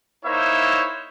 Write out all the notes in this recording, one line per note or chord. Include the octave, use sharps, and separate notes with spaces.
A#3 D#4 E4 C5 C#5 E5